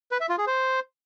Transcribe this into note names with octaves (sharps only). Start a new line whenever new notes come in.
B4
E5
F4
G#4
C5